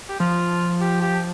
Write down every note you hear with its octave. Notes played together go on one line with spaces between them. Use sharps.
G4
F3 F4
G4
G4